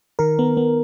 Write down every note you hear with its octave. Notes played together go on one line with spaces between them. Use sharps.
D#3 A#4
B3
B3